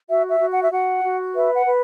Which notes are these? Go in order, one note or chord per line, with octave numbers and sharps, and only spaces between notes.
F#4 E5
E5
F#4
F#5
E5
F#4 F#5
F#4
B4 E5
F#5
B4